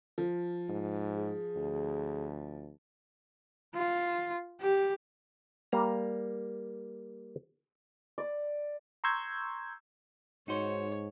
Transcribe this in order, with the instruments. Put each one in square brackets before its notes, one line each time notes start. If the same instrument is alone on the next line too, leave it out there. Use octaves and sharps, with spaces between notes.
[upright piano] F3
[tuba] G#2
[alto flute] G#4
[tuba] D2
[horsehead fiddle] F4
G4
[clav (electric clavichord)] G3 A#3 A#5
[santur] D5
[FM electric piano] A#5 C6 C#6 E6 G6 G#6
[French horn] G#2 [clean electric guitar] D#4 F#4 C5 [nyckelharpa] C#5